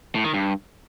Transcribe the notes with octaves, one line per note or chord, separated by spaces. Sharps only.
A2
D#3
G2